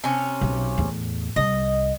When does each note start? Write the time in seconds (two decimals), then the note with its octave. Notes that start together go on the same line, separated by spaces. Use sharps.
0.04 C3 C#4
0.41 B1
0.78 E2 A2
1.36 C2 D#5